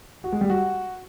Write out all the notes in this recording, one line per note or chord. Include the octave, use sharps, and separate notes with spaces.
F#4
G#3
G3
F#4